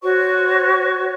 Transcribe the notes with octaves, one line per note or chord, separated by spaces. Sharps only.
F#4 C5 C#5 C#6